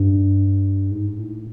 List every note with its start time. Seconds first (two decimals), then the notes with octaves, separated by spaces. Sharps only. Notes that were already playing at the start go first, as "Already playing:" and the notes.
Already playing: G2
0.91 G#2
1.18 A2